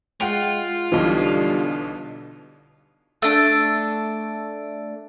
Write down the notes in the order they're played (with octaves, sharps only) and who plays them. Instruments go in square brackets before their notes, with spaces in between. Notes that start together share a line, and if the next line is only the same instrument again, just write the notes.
[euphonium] G#3 [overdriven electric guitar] F4 [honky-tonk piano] F#5 G5
[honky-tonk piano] B1 B2 E3 [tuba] D3 [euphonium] G3
[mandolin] A3 D4